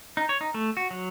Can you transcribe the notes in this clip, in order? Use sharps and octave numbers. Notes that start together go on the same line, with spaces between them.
D#4
C#5
D#4
A3
F#4
F#3